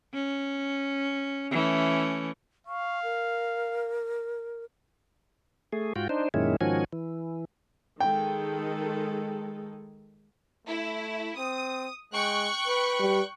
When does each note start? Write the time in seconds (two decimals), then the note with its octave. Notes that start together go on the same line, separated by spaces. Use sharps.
0.13 C#4
1.51 E3 A3 C#4
2.67 F5 C#6
3.03 A#4
5.73 A3 G#4
5.96 G#2 F4 F#4 G5
6.09 D4 D#4 C5
6.34 F#2 A#2 D#3 G#3 C#4 E4
6.61 G#2 D#3 F3 C#4 F#4 G#5
6.93 E3
8.00 D#3 G#3 A4 G5
10.67 A3 E4
11.37 C4 D#6
12.13 G#3 G5 C#6 F#6
12.68 B4
13.00 G3